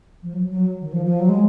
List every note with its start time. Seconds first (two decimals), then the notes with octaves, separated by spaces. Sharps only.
0.23 F3
0.33 F#3
0.50 F#3
0.81 D#3
0.93 F3
1.06 F3
1.20 F#3
1.29 G#3